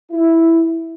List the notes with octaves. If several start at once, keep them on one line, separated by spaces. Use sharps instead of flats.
E4